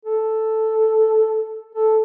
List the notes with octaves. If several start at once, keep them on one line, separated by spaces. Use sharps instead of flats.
A4
A4